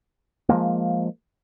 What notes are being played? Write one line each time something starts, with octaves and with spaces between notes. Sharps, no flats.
F3 F#3 G#3 A#3